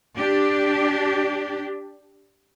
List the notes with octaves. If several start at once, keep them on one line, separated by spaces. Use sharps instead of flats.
D4 G4